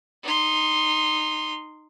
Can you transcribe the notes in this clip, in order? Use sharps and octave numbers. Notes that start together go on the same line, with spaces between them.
D#4 C6